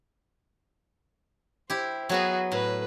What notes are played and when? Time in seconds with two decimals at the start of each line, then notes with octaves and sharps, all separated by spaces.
1.70 E4 G4 C5
2.09 F#3 B3 F#4 G#4 B4
2.52 A2 B4